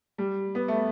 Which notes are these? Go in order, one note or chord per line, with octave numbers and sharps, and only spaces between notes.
G3
B3
A3